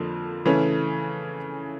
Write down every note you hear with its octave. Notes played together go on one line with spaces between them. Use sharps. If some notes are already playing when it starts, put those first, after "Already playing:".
Already playing: F2 D3 F3 A#3
C#3 E3 A3 C#4